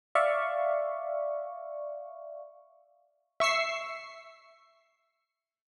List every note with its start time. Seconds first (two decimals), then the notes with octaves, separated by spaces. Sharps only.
0.15 D5 E5 F5 C#6
3.40 E5 C#6 E6 C7